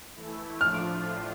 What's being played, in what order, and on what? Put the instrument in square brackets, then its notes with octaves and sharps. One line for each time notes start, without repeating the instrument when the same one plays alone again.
[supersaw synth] E3 A3 E4
[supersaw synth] A2 F3 A3 D4 F4 [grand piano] F6